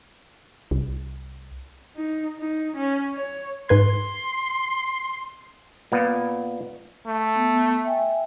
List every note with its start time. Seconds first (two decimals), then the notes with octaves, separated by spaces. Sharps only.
0.71 C2
1.96 D#4
2.38 D#4
2.76 C#4
3.15 C#5
3.69 G#2 B4 C6 G#6
5.92 A#2 A#3 B3
7.06 A3
7.36 B3
7.85 E5 G5 G#5